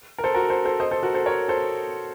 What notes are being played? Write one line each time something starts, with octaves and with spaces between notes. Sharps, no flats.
A#4
A4 C5
F#4 A#4
A4 C5
A4 C5
C5 D#5
A4 C5
F#4 A#4
A4 C5
A#4 C#5
A4 C5